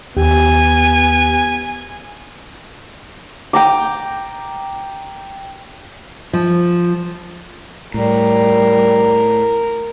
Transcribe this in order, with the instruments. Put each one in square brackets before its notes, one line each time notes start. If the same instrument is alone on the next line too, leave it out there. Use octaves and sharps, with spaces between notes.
[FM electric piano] D#2 G4 [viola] B3 G#5
[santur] G5 A#5 D6
[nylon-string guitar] F3
[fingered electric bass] A2 [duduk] G3 [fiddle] A#4